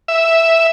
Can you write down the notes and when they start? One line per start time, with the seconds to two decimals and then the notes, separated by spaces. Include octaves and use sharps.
0.08 E5